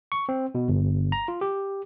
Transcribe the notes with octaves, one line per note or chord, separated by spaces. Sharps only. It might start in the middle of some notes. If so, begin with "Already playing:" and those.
C#6
C4
B2
G1
A#5
F4
G4